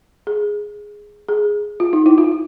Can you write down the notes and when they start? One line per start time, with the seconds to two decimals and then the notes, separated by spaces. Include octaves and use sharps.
0.27 G#4
1.29 G#4
1.80 F4
1.93 D#4
2.06 E4
2.18 F4